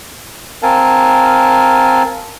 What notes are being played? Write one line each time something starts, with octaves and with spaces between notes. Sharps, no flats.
C4 A#4 F5 G#5 A5